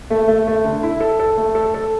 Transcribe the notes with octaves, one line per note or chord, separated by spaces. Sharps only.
A3
A3
A3
D3
E4
A4
A4
A3
A4
A4